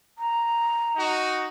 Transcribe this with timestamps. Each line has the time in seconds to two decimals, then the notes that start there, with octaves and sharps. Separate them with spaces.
0.18 A#5
0.96 D#4 F#4